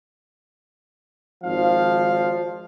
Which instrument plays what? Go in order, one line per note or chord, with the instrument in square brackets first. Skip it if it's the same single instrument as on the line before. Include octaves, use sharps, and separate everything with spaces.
[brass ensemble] G#1 F5 [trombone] F3